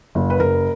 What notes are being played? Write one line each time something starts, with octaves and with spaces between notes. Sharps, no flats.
F#1
B4
F#1 A#4